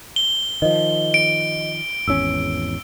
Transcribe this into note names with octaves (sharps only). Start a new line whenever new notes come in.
G7
D#3 F3 D#5
D7
G#1 E2 C#4 E6